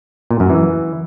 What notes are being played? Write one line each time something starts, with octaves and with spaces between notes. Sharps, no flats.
A#2
F#2
E3